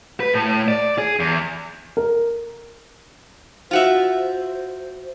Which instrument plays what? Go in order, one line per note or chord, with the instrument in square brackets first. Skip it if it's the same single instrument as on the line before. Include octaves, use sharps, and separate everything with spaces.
[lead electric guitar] B4
A2
D5
G#4
E2
[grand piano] A#4
[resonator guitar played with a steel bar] F4 F#4 E5 [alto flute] C5